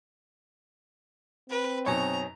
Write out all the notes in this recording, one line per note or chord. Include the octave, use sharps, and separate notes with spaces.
C4 B4
F#2 B2 D#4 C#5 G#5 A#5